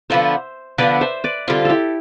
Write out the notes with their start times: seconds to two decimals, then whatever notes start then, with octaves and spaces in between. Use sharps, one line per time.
0.10 D3 F3 B3 D4 C5 E5
0.78 D3 F3 B3 D4 B4 D5
1.01 C5 E5
1.24 B4 D5
1.48 D3 G3 C4 F4
1.65 E4 G4 A4